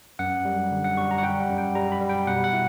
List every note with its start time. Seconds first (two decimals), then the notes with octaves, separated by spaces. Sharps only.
0.19 F#2 F#5
0.45 G3
0.71 D3
0.84 F#5
0.97 G3 C#6
1.11 A#5
1.18 F#5
1.23 G3 G5
1.40 F#5
1.49 F#2
1.58 G5
1.75 G3 A#5
1.92 B5
2.01 G3
2.09 G5
2.27 B2 F#5
2.44 F#5
2.53 E4